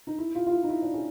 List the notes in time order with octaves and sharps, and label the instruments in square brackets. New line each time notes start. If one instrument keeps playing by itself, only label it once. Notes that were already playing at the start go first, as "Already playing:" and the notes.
[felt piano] D#4
E4
F4
F4
E4
D#4
E4
D4
C#4